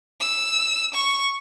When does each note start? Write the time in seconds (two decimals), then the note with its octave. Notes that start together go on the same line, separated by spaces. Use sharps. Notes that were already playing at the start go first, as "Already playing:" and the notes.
0.20 E6
0.94 C#6